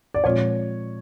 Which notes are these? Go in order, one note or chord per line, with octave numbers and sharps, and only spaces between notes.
D5
A#2 F3 G#3 C4 F4 C#5